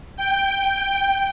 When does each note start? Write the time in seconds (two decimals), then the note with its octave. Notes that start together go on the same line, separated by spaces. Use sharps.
0.17 G5